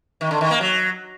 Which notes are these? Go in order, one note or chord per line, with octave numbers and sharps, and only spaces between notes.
D#3
D3
D#3
A#3
F#3